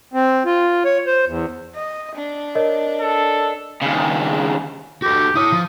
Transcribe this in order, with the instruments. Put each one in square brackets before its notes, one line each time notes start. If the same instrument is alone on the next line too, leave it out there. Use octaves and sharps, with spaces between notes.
[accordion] C4
F4
C#5
C5
E2
[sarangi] D#5
D4
[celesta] A#4 C#5 D#5
[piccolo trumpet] A4
[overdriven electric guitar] D#2 C#3
[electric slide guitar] F#4 A4 [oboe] G4
[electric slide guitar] E4 C#5 [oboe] D#6
[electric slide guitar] F3